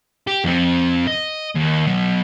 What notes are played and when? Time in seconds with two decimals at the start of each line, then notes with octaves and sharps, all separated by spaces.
0.27 G4
0.45 F2 C4
1.07 D#5
1.55 D#2
1.87 F#3 B3